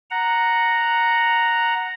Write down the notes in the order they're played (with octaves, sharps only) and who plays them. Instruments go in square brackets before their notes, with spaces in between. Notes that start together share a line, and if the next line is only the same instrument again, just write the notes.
[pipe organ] F#5 A#5